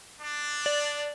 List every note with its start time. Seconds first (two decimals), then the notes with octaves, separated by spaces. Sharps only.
0.19 D4
0.66 D5